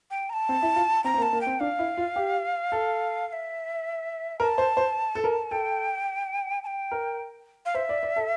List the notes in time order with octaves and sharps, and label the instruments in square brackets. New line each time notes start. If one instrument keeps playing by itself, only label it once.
[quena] G5
A#5
A5
[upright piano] C4
E4
F4
[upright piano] C4 [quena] A#5
[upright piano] C4
A#3
[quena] A5
[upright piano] A#3
[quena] G5
[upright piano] C4
[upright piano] D4 [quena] F5
[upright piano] E4
F4
G4
A4
[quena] F5
E5
[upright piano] A#4 [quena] A5
[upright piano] C5
C5
A4
A#4
[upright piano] A4 [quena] G5
[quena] A5
G5
[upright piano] A#4
[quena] F5
[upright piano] C5 [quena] E5
[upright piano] D5
D5
A4